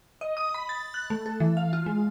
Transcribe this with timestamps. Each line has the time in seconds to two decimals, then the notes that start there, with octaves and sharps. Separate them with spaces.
0.21 D#5
0.37 D#6
0.54 B5
0.69 A6
0.94 F#6
1.10 A3
1.26 A4
1.40 E3
1.57 F5
1.73 F4
1.86 G#3